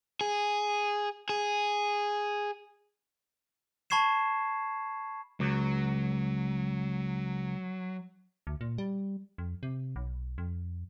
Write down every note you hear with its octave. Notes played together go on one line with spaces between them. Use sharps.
G#4
G#4
A5 B5 C#6 G#6 C7 E7
C#2 F#3
D2
A#2
G3
F2
C3
B1
F2